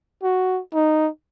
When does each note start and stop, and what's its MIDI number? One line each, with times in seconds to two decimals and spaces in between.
0.23 0.61 66
0.74 1.09 63